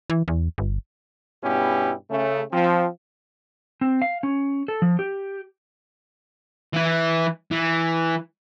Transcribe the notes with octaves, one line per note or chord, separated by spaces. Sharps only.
E3
E2
G1
G2 B2 B3 C#4 E4 G4
C#3 A3
F3 C4
C4
F5
C#4
A4
F3
G4
E3 E4
E3